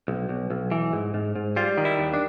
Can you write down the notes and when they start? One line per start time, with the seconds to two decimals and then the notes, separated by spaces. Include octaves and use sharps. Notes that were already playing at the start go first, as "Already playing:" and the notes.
0.08 B1
0.29 B1
0.50 B1
0.71 E3
0.93 G#2
1.14 G#2
1.35 G#2
1.56 G3 F4
1.78 D#3
1.85 E4
1.99 D#2
2.14 D4